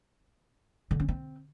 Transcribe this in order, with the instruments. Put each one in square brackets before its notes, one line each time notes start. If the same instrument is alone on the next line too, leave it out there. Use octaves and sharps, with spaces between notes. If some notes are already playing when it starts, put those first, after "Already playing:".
[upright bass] D3
C#4
C4